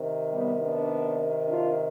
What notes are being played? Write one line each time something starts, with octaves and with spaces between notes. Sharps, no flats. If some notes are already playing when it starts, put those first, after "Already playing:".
Already playing: C3 D#3
G3 B3
B3 D4
D4 F4